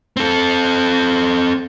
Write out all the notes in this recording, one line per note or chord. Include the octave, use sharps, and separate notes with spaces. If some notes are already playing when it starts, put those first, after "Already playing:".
C4 A4